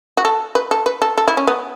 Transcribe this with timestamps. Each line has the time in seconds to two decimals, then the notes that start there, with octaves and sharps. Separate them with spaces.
0.17 F#4
0.25 A4
0.55 B4
0.71 A4
0.86 B4
1.02 A4
1.18 A4
1.28 E4
1.37 C#4
1.47 B3